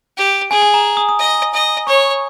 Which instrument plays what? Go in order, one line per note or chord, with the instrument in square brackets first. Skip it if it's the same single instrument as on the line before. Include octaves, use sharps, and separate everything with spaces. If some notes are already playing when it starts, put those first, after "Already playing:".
[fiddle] G4
[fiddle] G#4 [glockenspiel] G#5
[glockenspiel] G#5
A#5
D#6
D#6
[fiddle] D#5
D#5
[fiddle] C#5 [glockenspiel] C#6